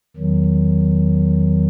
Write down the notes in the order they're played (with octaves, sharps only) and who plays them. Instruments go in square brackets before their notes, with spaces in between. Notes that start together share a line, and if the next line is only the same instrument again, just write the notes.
[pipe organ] E2 D#3 F#3